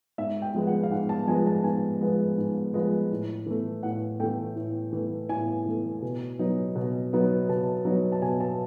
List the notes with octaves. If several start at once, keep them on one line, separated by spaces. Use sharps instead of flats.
G#2 E5
G5
F3 G#3 B3
F#5
F5
G#2 F#5
A5
F3 G#3 B3 G#5
A5
G#2 G#5
F3 G#3 B3
G#2
F3 G#3 B3
A2
E3 A3
A2 F#5
E3 A3 G5
A2
E3 A3
A2 G#5
E3 A3
B2
F#3 B3 D#4
B2
F#3 B3 D#4
B2 A5
F#3 B3 D#4
A5
B2 G#5
A5